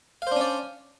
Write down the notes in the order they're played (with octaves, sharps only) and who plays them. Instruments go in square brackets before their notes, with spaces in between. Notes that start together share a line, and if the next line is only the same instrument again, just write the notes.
[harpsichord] F5
C5
D4
C#4
D5